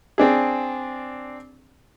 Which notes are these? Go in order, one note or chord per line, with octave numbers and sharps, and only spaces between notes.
C4 D4 G#4